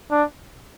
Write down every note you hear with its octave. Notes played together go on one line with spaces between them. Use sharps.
D4